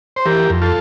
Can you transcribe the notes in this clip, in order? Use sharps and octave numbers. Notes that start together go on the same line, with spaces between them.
C5
E3 G4 A#4
F2
F4 A4